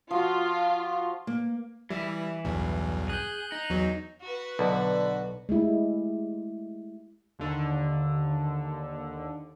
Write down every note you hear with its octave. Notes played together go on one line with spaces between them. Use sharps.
F3 F4 F#4
A#3
E3 G3 E5
B1 E2 G2
G#4 F#6 G6
D#4
E2 F#3
F#4 B4
B1 D3
G#3 A3 E4 G4
D#2 D3